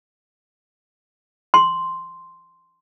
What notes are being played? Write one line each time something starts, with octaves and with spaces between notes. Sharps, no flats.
C6